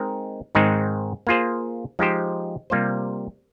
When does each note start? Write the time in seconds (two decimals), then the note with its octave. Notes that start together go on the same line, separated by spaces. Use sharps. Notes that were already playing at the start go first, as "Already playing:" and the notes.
Already playing: G#3 C4 D#4 A#4
0.55 G#2 D#3 G#3 C4 D#4
1.27 A#3 F4 G#4 C5
1.99 F3 G#3 D#4 G4 C5
2.70 C3 G3 A#3 F4 C5